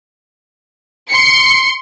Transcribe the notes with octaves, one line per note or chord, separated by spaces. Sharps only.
C6 C7 C#7